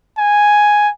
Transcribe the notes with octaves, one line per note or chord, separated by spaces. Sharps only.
G#5